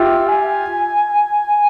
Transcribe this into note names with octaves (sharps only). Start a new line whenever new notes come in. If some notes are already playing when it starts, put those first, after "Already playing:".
Already playing: F4 G4 E5
G#5